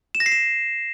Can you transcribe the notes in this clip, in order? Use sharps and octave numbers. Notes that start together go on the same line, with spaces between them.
E7
A#6
C7
E7